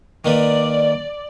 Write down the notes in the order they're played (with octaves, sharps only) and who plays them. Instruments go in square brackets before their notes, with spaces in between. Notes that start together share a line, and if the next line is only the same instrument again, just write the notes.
[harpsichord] D#3 A#3 B4 [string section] D5